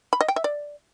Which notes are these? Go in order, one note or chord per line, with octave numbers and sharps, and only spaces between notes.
B5
D#5
G5
E5
D5